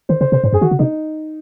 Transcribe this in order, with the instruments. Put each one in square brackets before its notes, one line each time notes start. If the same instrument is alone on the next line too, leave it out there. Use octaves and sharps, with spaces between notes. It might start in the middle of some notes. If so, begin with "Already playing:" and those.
[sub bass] D#3 [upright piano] C5
[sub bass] C#3 [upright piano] C5
[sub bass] C3 [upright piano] C5
[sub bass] G#2 [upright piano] C5
[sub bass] F#2 [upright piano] G#4
[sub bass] D#3 [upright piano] F#4
[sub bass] C#3
[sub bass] C3 [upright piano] D#4